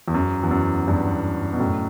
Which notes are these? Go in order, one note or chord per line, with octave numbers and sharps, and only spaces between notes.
E2
F#2
E2
F#2
E2 G2
B2
F#2 A2